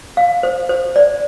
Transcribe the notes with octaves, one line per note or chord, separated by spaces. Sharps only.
F5
C5
C5
D5